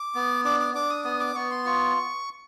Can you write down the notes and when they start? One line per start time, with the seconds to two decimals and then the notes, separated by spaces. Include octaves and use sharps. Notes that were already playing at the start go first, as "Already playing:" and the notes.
Already playing: D6
0.15 B3
0.45 D4 D6
0.60 D6
0.75 D4 D6
0.90 D#6
1.05 B3 D#6
1.20 D6
1.35 B3 C#6
1.51 C6
1.65 F4 C#6